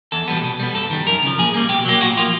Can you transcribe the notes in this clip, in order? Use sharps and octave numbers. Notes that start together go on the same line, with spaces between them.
E2 A4
B2 G3 B3
B2
G3 B3
G2 A4
D#3 G3
F#2 A#4
C#3 F3
A#2 G#4
G3 A#3
B2 G4
F#3 A#3 G4
A#2 F#4
F3 A#3 F4